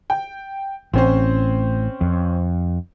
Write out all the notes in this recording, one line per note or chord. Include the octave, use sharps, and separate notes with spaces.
G5
A1 C4 C#4 C5
F2